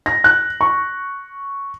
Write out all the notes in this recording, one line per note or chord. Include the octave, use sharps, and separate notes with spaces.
A#6
F#6
C#6